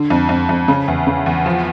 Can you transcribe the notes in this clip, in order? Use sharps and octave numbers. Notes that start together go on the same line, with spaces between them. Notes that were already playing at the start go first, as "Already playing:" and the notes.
Already playing: D3
F2
F2
F2
C#3
E2
C#3
E2
F3